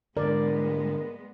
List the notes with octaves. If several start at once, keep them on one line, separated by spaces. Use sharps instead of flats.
G#2 D3 G#3 B3 A#4 D5